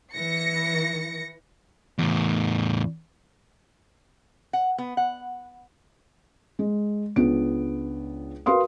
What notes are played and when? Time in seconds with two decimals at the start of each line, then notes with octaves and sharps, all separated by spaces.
0.15 E3 A#6 C#7
1.99 E2 A2
4.53 F#5
4.78 B3
4.97 F#5
6.59 G#3
7.16 C#2 B3 D4 D7
8.46 F#4 A#4 B4 F5 C6 D#6